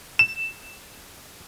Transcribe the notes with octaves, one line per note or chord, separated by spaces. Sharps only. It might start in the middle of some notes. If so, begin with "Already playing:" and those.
E7